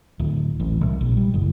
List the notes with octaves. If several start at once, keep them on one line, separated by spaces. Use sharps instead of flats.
D1
A1
C2
A#1
G3
F#1